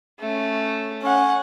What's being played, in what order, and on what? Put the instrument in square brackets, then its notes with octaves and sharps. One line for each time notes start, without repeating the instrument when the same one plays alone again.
[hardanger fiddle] A3 C#4
[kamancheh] C#4 F#5